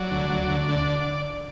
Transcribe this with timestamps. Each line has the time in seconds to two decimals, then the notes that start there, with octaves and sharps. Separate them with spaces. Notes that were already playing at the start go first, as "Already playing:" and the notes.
Already playing: F#3 D5
0.11 D2
0.30 F#3
0.49 D2
0.69 D3